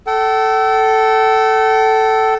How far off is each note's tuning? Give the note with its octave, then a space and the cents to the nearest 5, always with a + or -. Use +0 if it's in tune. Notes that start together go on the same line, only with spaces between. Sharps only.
A4 +0 G5 -45